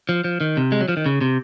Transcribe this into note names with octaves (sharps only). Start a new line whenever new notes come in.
F3
F3
D#3
C3
G#3
F#3
F3
D#3
C#3
C3